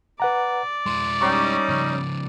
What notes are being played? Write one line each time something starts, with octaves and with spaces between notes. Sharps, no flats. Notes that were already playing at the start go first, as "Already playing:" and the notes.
B4 D5 F#5 A#5
G#3 E4 C6
G3 C#4 D#4 C#6 D6
C#3 F3